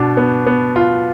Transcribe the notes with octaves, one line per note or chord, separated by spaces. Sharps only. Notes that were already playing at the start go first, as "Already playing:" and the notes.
Already playing: B2 D4
B3
B3
F4